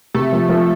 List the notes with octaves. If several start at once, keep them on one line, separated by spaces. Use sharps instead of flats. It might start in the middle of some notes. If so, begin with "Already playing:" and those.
C3 A3
F3
F3